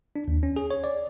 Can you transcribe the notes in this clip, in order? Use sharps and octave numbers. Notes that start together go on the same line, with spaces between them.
D4
D#2
C#4
G#4
C#5
D5